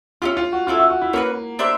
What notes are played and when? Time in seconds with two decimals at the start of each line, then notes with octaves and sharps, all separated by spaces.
0.22 C#4 E4 F4 G4
0.37 F4
0.53 F#4
0.67 C#4 E4 F4 A4
0.79 F#4
0.90 F#4
1.02 E4
1.13 A#3 C#4 F#4 B4
1.59 D4 G4 C5 E5